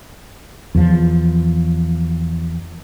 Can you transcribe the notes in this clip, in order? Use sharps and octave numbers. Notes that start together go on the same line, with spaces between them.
E2 F3